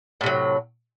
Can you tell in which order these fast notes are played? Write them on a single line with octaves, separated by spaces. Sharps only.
A2 C3 F#3